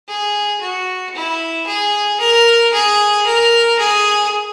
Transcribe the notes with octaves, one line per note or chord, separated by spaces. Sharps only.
G#4
F#4
E4
G#4
A#4
G#4
A#4
G#4